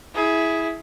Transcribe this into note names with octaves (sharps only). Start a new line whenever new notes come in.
E4 G#4